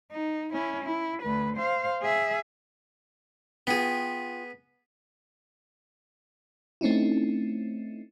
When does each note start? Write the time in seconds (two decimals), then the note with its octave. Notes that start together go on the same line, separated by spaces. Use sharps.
0.12 D#4
0.52 C#4 E4
0.84 E4
1.22 D2 B4
1.56 C5 F5
2.02 G#4 E5
3.67 B3 F4 G#4 G5
6.81 A3 C4 C#4 D#4 E4